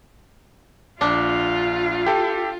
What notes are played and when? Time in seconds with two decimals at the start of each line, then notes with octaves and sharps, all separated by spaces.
1.01 A#1 D4 F4
2.06 G4 A4